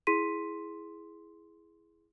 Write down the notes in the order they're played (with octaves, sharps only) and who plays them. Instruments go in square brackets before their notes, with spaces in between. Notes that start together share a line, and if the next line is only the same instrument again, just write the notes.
[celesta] E4 G#4 C6 B6 D#7